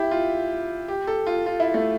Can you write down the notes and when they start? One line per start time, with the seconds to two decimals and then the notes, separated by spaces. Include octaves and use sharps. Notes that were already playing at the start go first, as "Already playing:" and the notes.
Already playing: E4 G4
0.11 F4
0.88 G4
1.07 A4
1.26 F4
1.46 F4
1.60 E4
1.74 A3